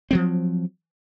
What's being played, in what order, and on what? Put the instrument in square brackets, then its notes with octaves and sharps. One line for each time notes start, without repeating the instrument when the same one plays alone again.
[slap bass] F3 F#3 C4